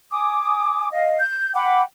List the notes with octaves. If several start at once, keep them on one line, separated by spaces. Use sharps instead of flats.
G#5 D6 D#6
D#5 F5
G6
F#5 G5 B5 D6